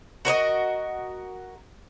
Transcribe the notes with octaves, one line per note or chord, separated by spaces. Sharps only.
F#4 A#4 C#5 D#5